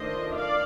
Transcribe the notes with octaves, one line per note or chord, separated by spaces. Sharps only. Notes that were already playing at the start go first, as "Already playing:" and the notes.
Already playing: D#3 A3 D4 F4 C5 D#5
D5 F5